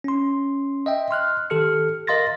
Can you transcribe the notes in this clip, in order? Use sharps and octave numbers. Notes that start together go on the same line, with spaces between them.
C#4 C6
D#5 E5 G5
C6 F6 F#6
D#3 G4 A4 F6 C#7
A#4 D#5 F5 C6 A6 A#6